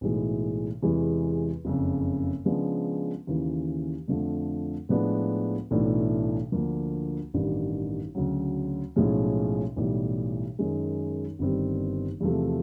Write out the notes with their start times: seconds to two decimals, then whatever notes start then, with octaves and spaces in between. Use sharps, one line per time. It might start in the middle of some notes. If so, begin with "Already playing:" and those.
0.01 B1 A2 E3 G#3
0.82 E2 C3 E3 G#3
1.65 F#1 F2 C#3
2.45 C#3 F3 G#3 B3 D4
3.27 D#2 C#3 E3
4.08 F2 D3 F3 A3
4.89 A2 F3 G#3 B3 D4
5.71 B1 A2 E3 A3 D4
6.52 D2 D3 F3 A#3
7.34 A1 G2 D#3 G3
8.15 D2 C#3 F#3
8.96 B1 A2 F3 G#3 C#4
9.76 B1 A2 E3 G3
10.59 F#2 D#3 G#3
11.39 G1 G2 D#3 G3 C4
12.20 E2 C3 F3 A3